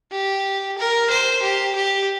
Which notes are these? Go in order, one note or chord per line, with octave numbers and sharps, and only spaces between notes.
G4
A#4
C5
G4
G4